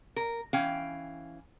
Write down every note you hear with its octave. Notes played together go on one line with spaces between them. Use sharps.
A#4
E3 C#4 F5 G5